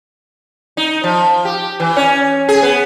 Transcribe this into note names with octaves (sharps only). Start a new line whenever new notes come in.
D#4
F3
G4
E3
C#4
G#4
B3